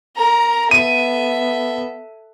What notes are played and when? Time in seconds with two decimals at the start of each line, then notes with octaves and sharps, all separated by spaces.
0.16 A#4 A#5
0.71 B3 A4 E5 D#7